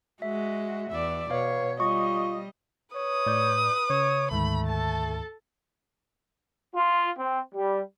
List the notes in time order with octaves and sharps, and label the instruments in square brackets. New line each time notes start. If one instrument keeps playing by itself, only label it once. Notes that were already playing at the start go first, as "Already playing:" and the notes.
[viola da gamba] G#3 [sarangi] F#4 [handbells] E5
[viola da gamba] E2 D5 [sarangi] E5
[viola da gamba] B2 [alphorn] B4 [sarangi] C#5 [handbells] F5
[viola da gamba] G3 [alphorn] F4 [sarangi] D#5 [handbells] C#6
[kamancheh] B4 D#6 [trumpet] C#5
[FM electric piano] A2 D5 G6
[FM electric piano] C#3 [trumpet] C#5
[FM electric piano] D2 G#2 D#3 [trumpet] A3 [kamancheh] B5
[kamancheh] A4 A5
[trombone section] F4
C4
G3